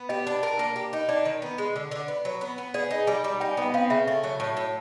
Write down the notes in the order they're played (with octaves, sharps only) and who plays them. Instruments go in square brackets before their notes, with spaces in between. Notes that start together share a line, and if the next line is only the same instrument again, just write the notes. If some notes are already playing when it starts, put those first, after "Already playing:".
Already playing: [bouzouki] B3
[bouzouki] G4 [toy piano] D#5
[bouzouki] D4
A#4
A#3
G4
D#4
[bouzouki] D4 [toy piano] D5
[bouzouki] D#3
B3
G#3
D3
D3
B3
F#3
B3
B3
[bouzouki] G#4 [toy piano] D5
[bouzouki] D#4
[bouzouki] G3 [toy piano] G#5
[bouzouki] G3
[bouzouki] D#4 [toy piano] G5
[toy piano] G#5
[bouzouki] B3 [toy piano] G5
[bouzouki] C4 [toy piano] F5
[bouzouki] C#3 [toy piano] E5
[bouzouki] A3 [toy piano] E5
[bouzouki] F#3
A2
A2